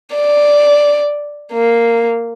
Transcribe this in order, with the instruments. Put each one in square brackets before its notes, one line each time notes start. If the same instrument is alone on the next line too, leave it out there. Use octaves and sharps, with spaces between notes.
[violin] D5
A#3